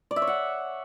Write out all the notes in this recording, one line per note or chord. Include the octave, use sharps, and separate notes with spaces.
D5
E5
C#5
F#5